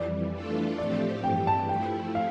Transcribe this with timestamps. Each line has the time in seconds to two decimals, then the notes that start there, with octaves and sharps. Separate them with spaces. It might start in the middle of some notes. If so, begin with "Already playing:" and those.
Already playing: F2 E3 G3 D5
0.33 E3 A3 D4 F4 A4
0.78 A2 F3 A3 C4 G4 D5
1.24 G2 E3 G3 G5
1.47 A5
1.69 F3 A3 E4 G5
2.15 F5